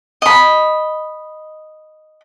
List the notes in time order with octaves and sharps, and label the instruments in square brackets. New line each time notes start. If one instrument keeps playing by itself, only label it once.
[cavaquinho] D#5 B5